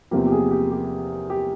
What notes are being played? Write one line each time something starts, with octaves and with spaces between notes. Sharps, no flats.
E2 C3 F3 A#3 G4
G4
G#4
G4
G4
G4